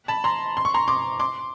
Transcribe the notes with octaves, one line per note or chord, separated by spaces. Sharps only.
A5 B5
A#5 C6
C6
C#6
A#5 C6
C6 D6
C6 D6